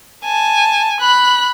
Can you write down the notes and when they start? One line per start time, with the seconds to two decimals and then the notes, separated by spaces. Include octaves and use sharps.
0.25 G#5 A5
1.00 B5 F#6